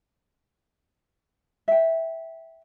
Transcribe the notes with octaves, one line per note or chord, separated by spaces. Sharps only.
E5 G5